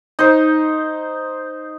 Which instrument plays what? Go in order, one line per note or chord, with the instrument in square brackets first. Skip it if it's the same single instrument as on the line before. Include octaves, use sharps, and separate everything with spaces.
[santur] D#4 C5